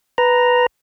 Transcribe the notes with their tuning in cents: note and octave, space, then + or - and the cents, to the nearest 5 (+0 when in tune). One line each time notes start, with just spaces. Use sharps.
B4 +0 A#5 +0